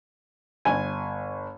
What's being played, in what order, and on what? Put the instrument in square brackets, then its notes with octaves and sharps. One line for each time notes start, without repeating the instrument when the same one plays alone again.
[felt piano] G1 [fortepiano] G#5